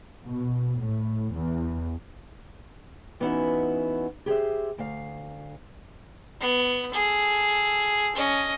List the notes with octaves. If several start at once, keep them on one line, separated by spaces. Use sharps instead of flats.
B2
A2
E2
E3 B3 C#4 D#4 E4 F#4
G4 G#4 C5 E5
D2 F5
B3
G#4 A4
C#4 D#5